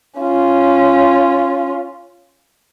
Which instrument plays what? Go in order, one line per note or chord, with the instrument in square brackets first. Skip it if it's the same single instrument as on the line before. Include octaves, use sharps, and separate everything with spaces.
[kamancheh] C#4 F4